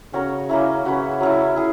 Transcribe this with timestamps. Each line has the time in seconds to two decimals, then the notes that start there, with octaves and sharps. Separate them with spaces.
0.13 C#3 C#4 F#4 A#4 C#5
0.49 A#3 C#4 E4
0.85 C#3 C#4 F#4 B4
1.21 F#3 C#4 E4
1.56 E4 G#4